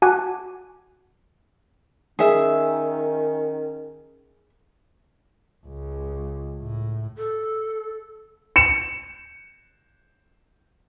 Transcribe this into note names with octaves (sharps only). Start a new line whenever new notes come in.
F#4 F#5 G#5 A5 D6 F#6
D#3 C#4 G#4 E5
C#2
A2
A4
C#7 E7